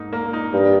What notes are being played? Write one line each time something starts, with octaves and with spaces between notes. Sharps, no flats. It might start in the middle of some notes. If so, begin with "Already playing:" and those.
Already playing: G#2 A#3 D#4
A#3
D#4
G2 G3